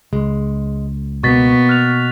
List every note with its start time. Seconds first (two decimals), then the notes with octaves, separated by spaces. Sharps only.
0.13 C#2 G#3
1.23 B2 A#3 B3 C#6 A6 B6
1.69 F6 F#6 F7